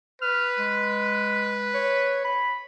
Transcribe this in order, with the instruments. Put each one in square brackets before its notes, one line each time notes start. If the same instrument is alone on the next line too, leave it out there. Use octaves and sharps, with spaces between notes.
[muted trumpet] B4 [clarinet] F6
[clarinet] G#3
C#5
B5